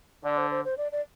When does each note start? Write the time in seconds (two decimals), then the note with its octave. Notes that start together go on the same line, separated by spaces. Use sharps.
0.23 D3 D5
0.38 C5
0.51 C5
0.65 C5
0.77 D5
0.92 D5